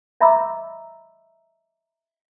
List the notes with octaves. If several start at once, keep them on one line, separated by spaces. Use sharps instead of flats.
D#5 E5 A#5 B5 D6 E6